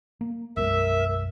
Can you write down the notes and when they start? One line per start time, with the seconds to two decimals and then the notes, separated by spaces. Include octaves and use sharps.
0.21 A#3
0.57 B1 F#2 G#3 A#4 E5